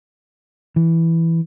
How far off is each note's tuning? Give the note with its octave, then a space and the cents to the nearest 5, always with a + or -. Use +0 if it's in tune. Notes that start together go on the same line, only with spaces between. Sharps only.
E3 +0